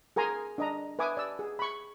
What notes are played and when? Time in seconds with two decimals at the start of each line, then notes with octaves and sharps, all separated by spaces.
0.16 G#4 A#4 G#5 A#5 C6
0.58 D4 D#5 A#5
0.99 B4 E5 G#5 D6 D#6
1.17 D5 E6
1.39 G#4
1.59 B5 C#6